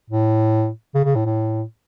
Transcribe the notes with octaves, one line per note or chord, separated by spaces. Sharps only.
A2
C#3
C#3
A2
A2